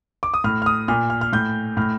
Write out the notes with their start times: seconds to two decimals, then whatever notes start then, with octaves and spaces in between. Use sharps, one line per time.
0.23 D6
0.34 D#6
0.44 A2 F6
0.62 F6
0.66 D#6
0.88 A#2 F6
1.10 F6
1.21 F6
1.33 A2 G6
1.77 A2 F6